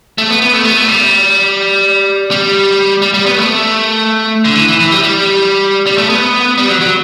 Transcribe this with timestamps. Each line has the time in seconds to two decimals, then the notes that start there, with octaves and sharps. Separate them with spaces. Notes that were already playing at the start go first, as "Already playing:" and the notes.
0.18 A3
0.30 B3
0.42 B3
0.53 A3
0.65 B3
0.77 A3
0.89 G3
2.31 G3
3.02 G3
3.14 G3
3.26 B3
3.37 A3
4.45 D3
4.55 E3
4.68 E3
4.80 E3
4.92 G3
5.04 G3
5.86 G3
5.98 A3
6.10 B3
6.58 G3
6.68 F#3
6.81 F#3